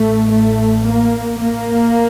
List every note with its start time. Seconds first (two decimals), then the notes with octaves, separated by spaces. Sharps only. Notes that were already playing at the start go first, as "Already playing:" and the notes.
Already playing: A1 A2 A3
0.31 A3
0.86 A#3
1.41 A#3